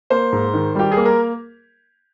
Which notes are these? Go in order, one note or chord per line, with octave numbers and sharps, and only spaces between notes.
A#3 C5
G#2
D#3
G3 G4
G#4
A#3
A#4